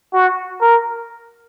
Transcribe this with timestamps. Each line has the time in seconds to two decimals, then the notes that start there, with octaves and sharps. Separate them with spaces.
0.13 F#4
0.61 A#4